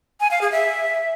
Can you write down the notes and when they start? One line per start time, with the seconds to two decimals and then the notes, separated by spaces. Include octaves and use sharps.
0.20 G#5
0.31 F5
0.41 G#4
0.52 E5